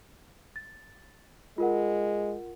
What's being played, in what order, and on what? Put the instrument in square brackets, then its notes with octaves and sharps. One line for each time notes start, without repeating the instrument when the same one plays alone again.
[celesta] A6
[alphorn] G#3 [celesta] F4 A#4 F#5